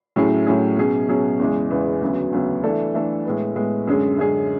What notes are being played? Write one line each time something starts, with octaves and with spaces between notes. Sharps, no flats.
A2 F#3 C#4 E4 G#4
A2 F#3 C#4 E4 G#4
B2 F#3 C#4 G#4
B2 F#3 C#4 G#4
E2 C#3 E3 G#3
E2 C#3 E3 G#3
D2 C#3 F#3 B3
D2 C#3 F#3 B3
E3 A3 D4 A4
E3 A3 D4 A4
A2 G#3 B3
A2 G#3 B3
F#2 D3 G#3 C#4 G#4
F#2 D3 G#3 C#4 G#4